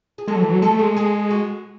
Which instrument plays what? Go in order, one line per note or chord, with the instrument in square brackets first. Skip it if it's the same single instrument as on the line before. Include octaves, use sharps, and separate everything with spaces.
[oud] G#4
[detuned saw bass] G#3 [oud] A4
[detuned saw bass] F#3
E3
F#3
[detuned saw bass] G#3 [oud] A4
[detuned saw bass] A3
[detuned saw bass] G#3 [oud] G#4
[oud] G#4
F#4